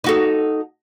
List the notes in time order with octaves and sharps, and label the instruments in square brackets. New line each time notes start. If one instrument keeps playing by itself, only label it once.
[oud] D#4 F#4 A4